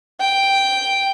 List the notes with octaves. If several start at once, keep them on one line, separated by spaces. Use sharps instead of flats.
G5